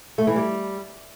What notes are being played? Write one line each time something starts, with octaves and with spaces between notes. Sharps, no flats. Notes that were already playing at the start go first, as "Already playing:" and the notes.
A3
E3
G3